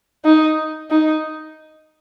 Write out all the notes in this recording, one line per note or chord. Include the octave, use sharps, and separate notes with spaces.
D#4
D#4